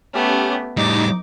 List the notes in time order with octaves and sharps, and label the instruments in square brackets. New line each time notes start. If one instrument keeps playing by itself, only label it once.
[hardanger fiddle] A3 B3 [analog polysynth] C#4 G4
[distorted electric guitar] A2 G3 [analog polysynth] D#4 [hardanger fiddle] D6